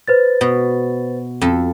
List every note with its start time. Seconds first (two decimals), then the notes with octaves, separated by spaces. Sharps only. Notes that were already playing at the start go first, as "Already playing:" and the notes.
0.08 B4 C5 A6
0.41 B2
1.41 F2 A4